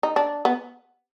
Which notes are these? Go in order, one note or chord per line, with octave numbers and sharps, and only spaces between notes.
D#4
D4
B3